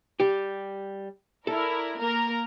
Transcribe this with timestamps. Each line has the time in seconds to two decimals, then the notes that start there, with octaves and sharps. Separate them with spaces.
0.20 G3 G4
1.47 E4 A4 A#4 D5
2.00 A#3 A#4 A#5